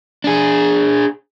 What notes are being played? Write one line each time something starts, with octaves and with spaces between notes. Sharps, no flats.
D4 G#4